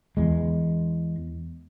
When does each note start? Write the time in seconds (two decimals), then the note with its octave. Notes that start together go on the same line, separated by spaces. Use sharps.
0.17 E2 G#3